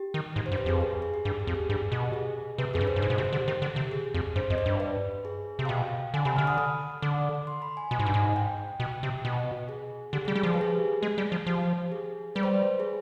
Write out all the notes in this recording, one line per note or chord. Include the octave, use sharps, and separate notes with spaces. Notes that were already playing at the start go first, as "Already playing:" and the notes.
Already playing: G4
D#3
G#2
C5
G2
B4
F2 G#4
G4
G#4
G4
G2 G#4
G#4
F2
G#4
G2 G4
B2
G#4
C3 B4
F2 G#4
G2
C5
G2
G#2 D5
B2
C3
C5
D3
G4
D#3 G4
D3
C3
G#4
F2
G2 C5
F2 D#5
D5
G2
B4
G#4
C3
F5
B2 G5
D3 G#5
C3 B5
D3 F6
D#6
D#6
D3 D6
C6
B5
G#5
B2 G#5
G#2
G2
G#2
G5
B2
C3
B2
G#4
D3 G4
G3 G#4
G3 G4
F3 G#4
B4
G#4
G#3
G3
F3
F3 G4
G#4
G3 B4
C5
B4
G#4